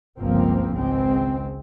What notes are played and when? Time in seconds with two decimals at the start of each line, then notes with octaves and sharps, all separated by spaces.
0.19 G1 C#2 F3 A#3 C4
0.72 G#1 C#2 G#3 C4